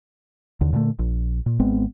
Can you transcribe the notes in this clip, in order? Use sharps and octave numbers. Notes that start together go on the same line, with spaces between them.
D#2 D3
A#2 D3 D#3 A3
A#1
A#2
G#1 G#3 B3 C4